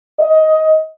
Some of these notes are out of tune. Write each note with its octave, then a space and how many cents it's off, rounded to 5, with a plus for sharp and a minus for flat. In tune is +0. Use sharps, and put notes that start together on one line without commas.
D#5 +15